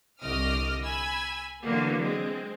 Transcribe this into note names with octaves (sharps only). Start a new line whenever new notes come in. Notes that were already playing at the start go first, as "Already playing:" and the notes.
C2 D3 D#5 D6 D#6 F6
G#5 B5 E6
D3 E3 F#3 A#3 B3
G#3 C4